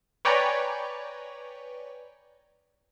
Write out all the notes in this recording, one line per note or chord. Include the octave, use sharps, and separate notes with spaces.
B4 C#5 D5 G5 G#5 A#5